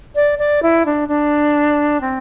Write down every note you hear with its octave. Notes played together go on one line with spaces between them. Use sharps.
D5
D5
E4
D4
D4
C4